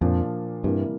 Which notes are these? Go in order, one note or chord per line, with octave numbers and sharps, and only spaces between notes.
F2 A#2 F3 A#3 D4 F4
G2 C3 E3 G3 A#3